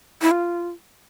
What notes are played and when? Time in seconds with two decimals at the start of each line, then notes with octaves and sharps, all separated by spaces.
0.22 E4
0.31 F4